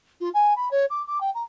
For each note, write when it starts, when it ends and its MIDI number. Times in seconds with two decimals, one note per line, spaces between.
0.21 0.29 65
0.34 0.54 80
0.56 0.69 83
0.71 0.86 73
0.90 1.03 86
1.07 1.19 86
1.21 1.31 79
1.35 1.43 82